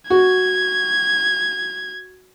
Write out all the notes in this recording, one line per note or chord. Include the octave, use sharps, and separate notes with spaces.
F#4 G#6